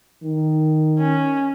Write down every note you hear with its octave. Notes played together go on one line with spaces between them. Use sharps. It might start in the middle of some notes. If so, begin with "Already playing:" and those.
D#3
C#4